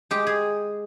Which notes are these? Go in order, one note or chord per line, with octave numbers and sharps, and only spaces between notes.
G#3 G4
G#4